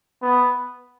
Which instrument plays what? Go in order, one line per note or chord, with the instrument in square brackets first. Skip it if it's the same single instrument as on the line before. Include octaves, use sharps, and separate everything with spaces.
[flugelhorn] B3